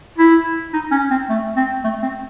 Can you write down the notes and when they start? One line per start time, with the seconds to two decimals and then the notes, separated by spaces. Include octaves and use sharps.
0.18 E4
0.73 D#4
0.91 C#4
1.10 C4
1.29 A3
1.56 C4
1.84 A3
2.02 C4